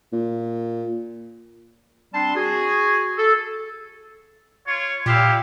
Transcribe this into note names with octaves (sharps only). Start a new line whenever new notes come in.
A#2
G3 C4 D4 A5 C6
F#4 G#4
A4
F4 C#5
A#2 E4 G4 F5